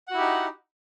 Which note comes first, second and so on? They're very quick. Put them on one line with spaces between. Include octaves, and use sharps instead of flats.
F#5 F#4 E4 G4 D#4